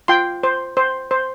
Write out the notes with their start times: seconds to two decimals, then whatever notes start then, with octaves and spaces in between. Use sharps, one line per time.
0.08 F4 G5 C6
0.43 C5
0.77 C5
1.11 C5